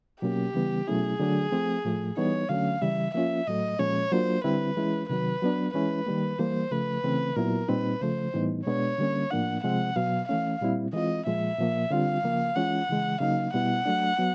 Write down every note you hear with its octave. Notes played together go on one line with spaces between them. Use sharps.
B2 F#3 A#3 C#4 G4
C#3 E3 G3 B3
B2 F#3 A3 C#4 E4 G#4
D3 F#3 A3 D4
F3 A3 C4
A2 F3 A3
E3 G3 B3 D#4 C#5
D3 F#3 A3 C#4 F5
C#3 E3 G3 E5
F3 A#3 C#4 F4 E5
A2 F#3 A3 D#5
A#2 F3 G#3 C#4 C#5
F#3 A#3 D4 F4 C5
D3 G3 C4 E4 B4
E3 G#3 C#4 E4
C3 D#3 F#3 B4
F#3 B3 D4
E3 G#3 C#4 E4 B4
D#3 G3 A#3
E3 G3 A#3 C5
C#3 F3 A3 B4
C#3 E3 A3 C4
A#2 F#3 B3 E4 A#4
A#2 G3 C4 D#4 B4
C#3 F3 A3 C5
A2 E3 G3 B3 D#4
B2 G#3 B3 D4 C#5
D3 G3 A#3 C#4
A2 F3 A#3 D4 F#5
C3 F3 G#3 C4 F#5
B2 F#3 B3 F5
E3 A3 C#4 F5
A#2 G3 C4 E4
E3 G#3 C4 F4 D#5
A#2 F3 G#3 E5
A#2 F3 A#3
D3 G3 C4 F4 F5
C#3 F3 A#3
E3 G#3 C#4 F4 F#5
C#3 E3 G#3
C#3 F#3 A#3 D#4 F5
B2 G3 B3 E4 F#5
F#3 A3 D4
F#3 B3